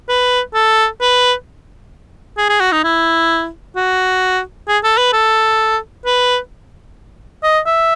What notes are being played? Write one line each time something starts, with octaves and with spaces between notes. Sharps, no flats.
B4
A4
B4
G#4
G#4
F#4
D#4
E4
F#4
G#4
A4
B4
A4
B4
D#5
E5